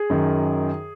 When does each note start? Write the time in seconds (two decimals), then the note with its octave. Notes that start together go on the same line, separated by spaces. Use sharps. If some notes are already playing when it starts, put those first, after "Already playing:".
Already playing: G#4
0.10 F#2 D#3